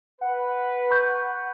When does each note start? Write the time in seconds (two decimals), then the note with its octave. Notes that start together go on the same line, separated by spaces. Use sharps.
0.21 B4 F#5
0.91 B5 C#6 G6